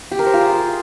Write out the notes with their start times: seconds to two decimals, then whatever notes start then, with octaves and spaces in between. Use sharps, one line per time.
0.12 G4
0.19 A#4
0.26 C5
0.34 F4
0.41 G#4